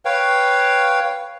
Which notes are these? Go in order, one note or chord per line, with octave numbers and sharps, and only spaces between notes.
B4 C#5 F5 G5